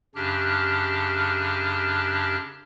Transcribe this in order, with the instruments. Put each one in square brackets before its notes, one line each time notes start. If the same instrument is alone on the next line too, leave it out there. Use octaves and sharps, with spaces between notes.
[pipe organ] F#2 C#3 D4 G4 F6 F#6